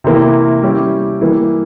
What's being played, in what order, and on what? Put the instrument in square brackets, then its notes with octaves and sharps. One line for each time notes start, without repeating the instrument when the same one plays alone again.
[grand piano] C3 E3 A#3 E4
G3 C#4 E4 G4
E3 G3 A#3